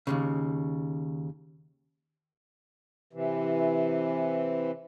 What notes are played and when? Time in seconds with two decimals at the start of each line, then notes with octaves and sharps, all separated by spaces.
0.07 D#2 A2 C#3
3.13 C3 E3